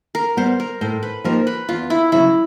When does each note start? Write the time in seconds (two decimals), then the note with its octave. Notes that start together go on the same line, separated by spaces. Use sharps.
0.15 A#4
0.37 G3 B3 C5
0.60 A#4
0.81 A2 C5
1.03 B4
1.24 F3 A#3 D#4 G4 A#4
1.47 B4
1.69 E2 F4
1.90 E4
2.12 C#3 F#3 E4